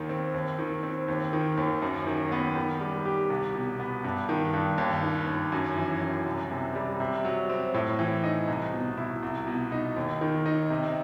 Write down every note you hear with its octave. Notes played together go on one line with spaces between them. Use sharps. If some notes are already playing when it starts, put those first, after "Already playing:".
Already playing: D#2 D#3
C4
D#2
D#3
C4
D#2
D#3
D#2
F#2
D#3
B3
D#3
G3
G4
C2
B2
B3
G2
D#3
G2
D#2
D#3
D#2
F#2
E3
F#2
C2
C3
G3
C3
F#3
C4
A2
E3
D#4
C2
B2
E4
C2
B2
D#4
D#2
D#3
D#4
C3